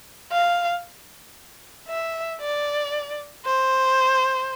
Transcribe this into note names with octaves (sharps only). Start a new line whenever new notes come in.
F5
E5
D5
C5